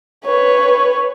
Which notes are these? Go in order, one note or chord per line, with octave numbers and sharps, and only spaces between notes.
B4 C#5